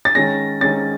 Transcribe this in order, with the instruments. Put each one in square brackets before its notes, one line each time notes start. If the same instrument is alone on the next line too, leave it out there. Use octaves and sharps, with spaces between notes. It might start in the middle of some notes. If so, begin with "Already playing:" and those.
[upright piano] A6
D#3 G#3 C#4 A#6
D#3 G#3 C#4 A6